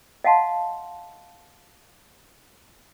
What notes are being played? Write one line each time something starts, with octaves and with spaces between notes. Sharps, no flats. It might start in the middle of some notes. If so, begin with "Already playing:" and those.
D#5 F5 F#5 A5 C6